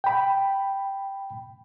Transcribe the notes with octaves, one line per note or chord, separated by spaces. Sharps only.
G5 B5